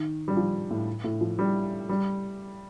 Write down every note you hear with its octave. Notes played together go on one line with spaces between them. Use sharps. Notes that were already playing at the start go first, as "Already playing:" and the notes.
Already playing: D#3
G3
F3
A2
A2
F3
G3
G3